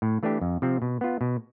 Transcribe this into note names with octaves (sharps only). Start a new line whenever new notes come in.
A2
E3 A3 D4 G4
F2
C3 F3 C4
B2
B3 F4
B2